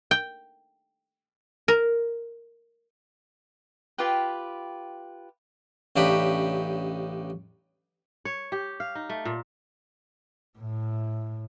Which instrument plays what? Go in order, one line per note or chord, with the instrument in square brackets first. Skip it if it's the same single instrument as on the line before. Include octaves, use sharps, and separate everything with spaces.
[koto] G5
A#4
[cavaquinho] F4 G4 B4 G5
[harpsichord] A1 C#3 D4 D#4 G4 B5
[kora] C#5
G4
F5
D#4
A3
A#2
[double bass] A2